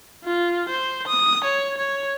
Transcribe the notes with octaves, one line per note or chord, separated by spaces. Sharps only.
F4
C5
D#6
C#5
C#5